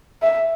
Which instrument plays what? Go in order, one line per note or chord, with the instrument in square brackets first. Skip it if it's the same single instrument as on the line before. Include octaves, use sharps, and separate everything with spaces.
[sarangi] E5